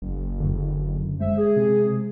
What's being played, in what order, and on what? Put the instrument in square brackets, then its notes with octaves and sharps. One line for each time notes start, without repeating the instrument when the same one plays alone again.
[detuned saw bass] F#1
[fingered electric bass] F#2 D3
[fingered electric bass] G#3 [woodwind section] C5 E5
[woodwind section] G#4
[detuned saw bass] C3